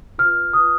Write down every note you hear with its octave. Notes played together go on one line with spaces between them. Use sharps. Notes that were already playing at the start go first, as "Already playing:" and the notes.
F4 B4 F6
F4 B4 D#6